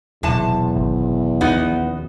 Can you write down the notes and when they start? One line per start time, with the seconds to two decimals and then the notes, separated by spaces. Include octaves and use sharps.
0.23 D#1 B1 E2 C3 A5
0.76 G#1
1.41 D#2 F3 B3 C#4 D#4 F#4